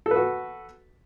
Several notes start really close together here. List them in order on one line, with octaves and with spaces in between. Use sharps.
A4 B4 F#4